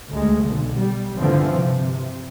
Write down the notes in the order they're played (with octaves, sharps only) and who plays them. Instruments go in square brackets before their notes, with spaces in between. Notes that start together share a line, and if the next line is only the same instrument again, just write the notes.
[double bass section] D2 G#3
B1 D3
G3
G2 D3 E3 F3 C4
C3